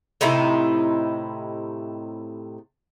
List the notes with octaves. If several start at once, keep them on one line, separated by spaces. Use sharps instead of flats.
A2 C3 D#4 E4